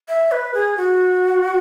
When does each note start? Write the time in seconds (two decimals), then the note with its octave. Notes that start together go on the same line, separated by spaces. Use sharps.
0.08 E5
0.32 B4
0.54 G#4
0.77 F#4